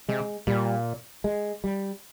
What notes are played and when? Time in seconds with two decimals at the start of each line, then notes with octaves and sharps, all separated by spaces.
0.09 C3 G#3
0.47 A#2 G3
1.24 G#3
1.64 G3